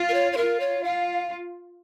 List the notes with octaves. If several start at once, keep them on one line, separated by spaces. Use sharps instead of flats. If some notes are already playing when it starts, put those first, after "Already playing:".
Already playing: F4
A#4
C#5
C#5
F4 A#4
C#5
F4 F5